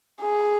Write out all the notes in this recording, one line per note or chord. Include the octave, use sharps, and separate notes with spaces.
G#4